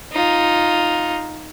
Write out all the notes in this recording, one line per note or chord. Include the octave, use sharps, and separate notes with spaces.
D#4 F4